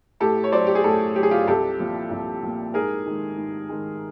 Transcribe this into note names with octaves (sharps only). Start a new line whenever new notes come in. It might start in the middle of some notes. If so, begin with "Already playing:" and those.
A2 G4 A4
C#5
F#3 C5 D5
G4
G#4
A2 G4 A4
F#3 G4
G#4
F4 G4
C2 G4 A4
A#2 F3
C2
A#2 F3
G#2 G#4 A#4
D#3 G#3
G#2
D#3 G#3